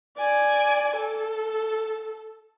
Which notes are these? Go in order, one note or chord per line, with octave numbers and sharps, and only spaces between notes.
D5 G#5
A4